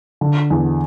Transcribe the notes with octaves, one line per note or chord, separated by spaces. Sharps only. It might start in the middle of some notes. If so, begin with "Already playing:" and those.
D3
E2